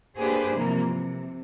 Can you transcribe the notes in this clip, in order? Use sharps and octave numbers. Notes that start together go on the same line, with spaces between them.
A#3 D4 G4 G#4 B4 C5
C3 E3 F3 G3 A#3
C3